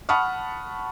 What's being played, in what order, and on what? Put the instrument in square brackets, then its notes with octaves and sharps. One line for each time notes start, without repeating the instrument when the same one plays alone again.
[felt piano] F#5 A5 B5 C#6 D#6 F6